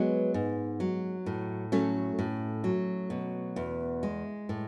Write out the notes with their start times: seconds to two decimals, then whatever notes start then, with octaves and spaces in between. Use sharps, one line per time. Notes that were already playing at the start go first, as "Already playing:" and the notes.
Already playing: F#3 G#3 B3
0.34 G#2
0.80 F#3
1.26 A2
1.72 F#3 A3 C#4
2.19 A2
2.64 F#3
3.10 B2
3.56 E2
4.03 G#3
4.49 A2